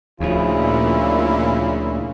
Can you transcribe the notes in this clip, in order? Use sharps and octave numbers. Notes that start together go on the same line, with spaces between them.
D2 A#2 C#3 F3 E4